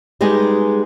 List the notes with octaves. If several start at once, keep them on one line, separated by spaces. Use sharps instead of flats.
G3 G#3 B3 D#4 G4 G#4